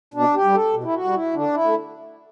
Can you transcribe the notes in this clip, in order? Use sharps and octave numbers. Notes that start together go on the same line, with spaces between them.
B2 D4
G4
G3
A4
B2
E4
F#4
G3
E4
D3 D4
E4
A3